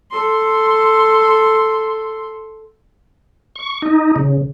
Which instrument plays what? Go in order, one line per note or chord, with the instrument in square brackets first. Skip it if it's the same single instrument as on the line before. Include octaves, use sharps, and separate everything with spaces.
[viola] A4 C6
[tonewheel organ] C#6
D#4
C#3